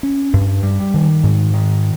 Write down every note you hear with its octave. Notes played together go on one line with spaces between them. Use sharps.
C#4
G2
G3
D#3
G#2
D#3